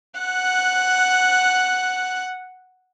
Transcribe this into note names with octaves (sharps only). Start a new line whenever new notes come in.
F#5 F#6